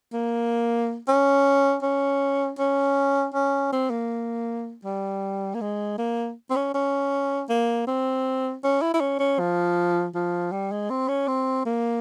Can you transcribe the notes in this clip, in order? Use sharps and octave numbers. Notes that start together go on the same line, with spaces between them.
A#3
C#4
C#4
C#4
C#4
C4
A#3
G3
A#3
G#3
A#3
C4
C#4
C#4
A#3
C4
C#4
E4
E4
C#4
C#4
F3
F3
G3
G#3
C4
C#4
C4
A#3